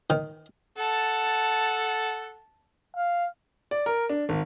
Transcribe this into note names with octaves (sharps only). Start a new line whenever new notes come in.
D#3
A4 F#5 A5
F5
D5
A#4
D4
G#1